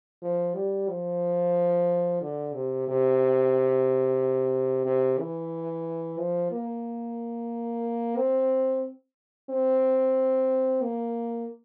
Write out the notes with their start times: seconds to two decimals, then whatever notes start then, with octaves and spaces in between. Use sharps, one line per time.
0.22 F3
0.55 G3
0.89 F3
2.22 D3
2.54 C3
2.88 C3
4.86 C3
5.19 E3
6.19 F3
6.51 A#3
8.17 C4
9.50 C4
10.82 A#3